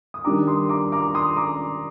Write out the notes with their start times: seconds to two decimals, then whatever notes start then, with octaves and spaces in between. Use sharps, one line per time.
0.14 D#6
0.24 D#3 G3 D4 A#5 D6
0.47 C6 D#6
0.69 A#5 D6
0.92 A#5 D6
1.14 C6 D#6
1.37 A#5 D6